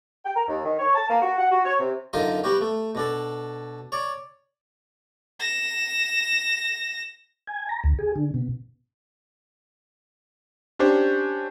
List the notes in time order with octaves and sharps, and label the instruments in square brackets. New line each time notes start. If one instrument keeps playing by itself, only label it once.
[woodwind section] G5
A#4
D#2
D#3
C#5
A5
A#3
F#4
F#5
F#4
C#5
C3
[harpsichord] F#2 D3 D#4 F4 A#4 D#5
G3 B3 F#4 G4
A3
B2 D4 A4
C#5 D5
[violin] A#6 E7
[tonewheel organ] G#5
A#5
D2
G#4
D3
B2
[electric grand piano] C#4 D4 G4 C5